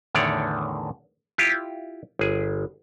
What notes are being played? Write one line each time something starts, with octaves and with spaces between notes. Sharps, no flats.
E2 A2 D3 D#3 C#5 D5
E4 F4 G4
G1 G#4